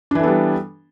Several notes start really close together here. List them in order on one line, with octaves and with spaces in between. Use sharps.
D4 E3 A4 B3 G3